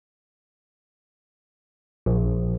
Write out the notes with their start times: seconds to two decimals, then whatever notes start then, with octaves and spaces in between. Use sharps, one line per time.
2.06 A#1